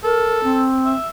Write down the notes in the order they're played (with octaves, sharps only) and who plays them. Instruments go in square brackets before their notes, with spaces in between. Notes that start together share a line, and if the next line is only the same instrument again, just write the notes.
[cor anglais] A4 [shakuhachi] A#4
[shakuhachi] C4
[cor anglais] E5